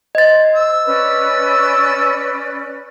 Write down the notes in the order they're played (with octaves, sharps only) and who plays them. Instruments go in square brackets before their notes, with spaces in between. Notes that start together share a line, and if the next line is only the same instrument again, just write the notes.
[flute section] C5 [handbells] D#5 A6
[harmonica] E6
[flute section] C#4 B4 D5